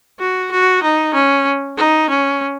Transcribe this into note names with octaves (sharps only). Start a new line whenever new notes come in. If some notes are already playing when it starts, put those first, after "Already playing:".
F#4
F#4
D#4
C#4
D#4
C#4